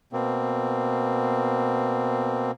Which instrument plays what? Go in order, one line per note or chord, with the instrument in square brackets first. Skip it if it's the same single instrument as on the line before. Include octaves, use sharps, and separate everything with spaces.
[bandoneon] B2 A#3 C4